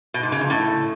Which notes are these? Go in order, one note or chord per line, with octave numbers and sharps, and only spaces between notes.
B2
G#2
C#3
F2
A2